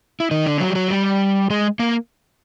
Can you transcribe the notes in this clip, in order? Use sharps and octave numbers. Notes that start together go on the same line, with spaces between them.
E4
D#3 D#4
D3 D4
F#3 F#4
G4
F#3 F#4
G3 G4
G#3 G#4
A#3 A#4